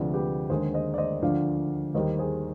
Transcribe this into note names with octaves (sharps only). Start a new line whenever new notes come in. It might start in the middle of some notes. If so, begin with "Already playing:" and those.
Already playing: D2 C3 F3 G#3 B4 D5
G4 B4
D#2 D3 G#3 G#4 C5
C5 D#5
D5
C5 D#5
D2 D3 F3 D5 F5
D#2 D#3 G3 C5 D#5
G#4 C5